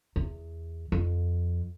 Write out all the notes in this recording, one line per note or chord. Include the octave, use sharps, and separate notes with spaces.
E2
F2